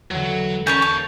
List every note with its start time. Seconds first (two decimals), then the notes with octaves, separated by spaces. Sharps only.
0.11 E2 D3 F#3
0.67 D#2 C#4 A#4 C#5 A5 C#6 G6
0.82 C#5